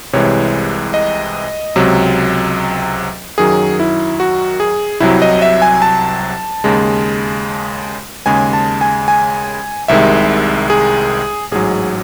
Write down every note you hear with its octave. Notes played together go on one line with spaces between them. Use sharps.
C2 C3 E3 G#3 C#5
D#5
C#2 C3 F#3
F#2 D#3 F#3 G#4
E4
F#4
G#4
C2 C3 F#3 E4
D#5
E5
G#5
A5
D#2 C#3 G#3
D#2 C#3 G#3 G#5
A5
G#5
G#5
C2 C3 D#3 G#3 E5
G#4
A1 G#2 F#3 G#4